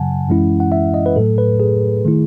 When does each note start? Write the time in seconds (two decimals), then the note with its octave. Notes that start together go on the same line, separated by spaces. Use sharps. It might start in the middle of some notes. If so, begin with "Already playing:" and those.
Already playing: F#2 C#3 F#3 F#5 G#5 A5
0.29 F#2 E3 G#3 C#4 E4
0.60 F#5
0.72 E5
0.94 D#5
1.06 B4
1.16 A2 F#3 A3 A4
1.38 B4
1.60 G#4
2.05 D#3 A3 E4